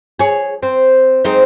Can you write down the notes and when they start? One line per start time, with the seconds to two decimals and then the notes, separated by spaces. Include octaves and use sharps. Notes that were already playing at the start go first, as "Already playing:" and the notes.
0.19 G#4 C#5
0.63 C4
1.25 G#3 C4 D#4